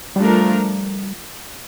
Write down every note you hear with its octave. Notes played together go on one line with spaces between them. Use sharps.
F3 G3 A3 D4 F4 A#4